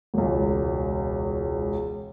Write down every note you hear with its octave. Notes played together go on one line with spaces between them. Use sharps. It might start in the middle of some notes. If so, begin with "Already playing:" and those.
E1 C#2